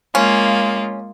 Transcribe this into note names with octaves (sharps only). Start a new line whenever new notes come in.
G#3 A#3 C#4 F4